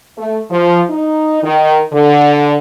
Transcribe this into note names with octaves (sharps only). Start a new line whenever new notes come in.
A3
F3
D#4
D#3
D3